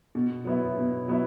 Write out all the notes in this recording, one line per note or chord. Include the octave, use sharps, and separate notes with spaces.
B2
F#3 B3 E4
B2
F#3 B3 E4